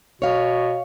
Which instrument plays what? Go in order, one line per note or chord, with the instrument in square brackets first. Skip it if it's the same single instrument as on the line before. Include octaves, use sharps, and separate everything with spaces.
[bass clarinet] B2 [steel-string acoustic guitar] C#5 F5